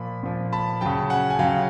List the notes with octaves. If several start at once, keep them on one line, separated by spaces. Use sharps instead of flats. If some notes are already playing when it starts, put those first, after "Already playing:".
Already playing: A#2 F3 B5
A#2 F3
A5 B5
C#3 F#3 G5 A5
F#5 G#5
G#5
C#3 F#3 F5 G5